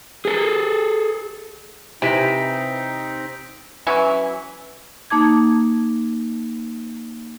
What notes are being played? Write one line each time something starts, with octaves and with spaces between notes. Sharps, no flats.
G#4 A4
C3 E3 C4 D#4 A#6 B6 D7
E3 F#3 C#4 E4
A#3 D#4 A5 D6 G#6